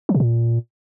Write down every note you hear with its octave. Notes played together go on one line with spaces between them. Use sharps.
F3
B2
A#2